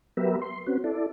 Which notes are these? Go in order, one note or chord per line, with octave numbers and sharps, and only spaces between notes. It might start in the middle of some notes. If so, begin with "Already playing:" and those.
F#3 B3 G4 A#4 B4 E5
C6
C4 C#4 F#4 B4
E4 A4 D5